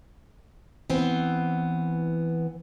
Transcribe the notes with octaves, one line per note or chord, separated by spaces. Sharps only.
E3 B3 C4